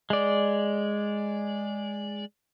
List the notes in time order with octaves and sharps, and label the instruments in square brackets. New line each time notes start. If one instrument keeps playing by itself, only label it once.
[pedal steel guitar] G#3 D5